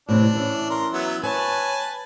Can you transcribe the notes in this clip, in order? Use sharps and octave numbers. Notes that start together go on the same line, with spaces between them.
A2 C3 E3 D4
E3 C#4
A#4 C6
F#3 B3 E5
B4 C#5 G#5 A5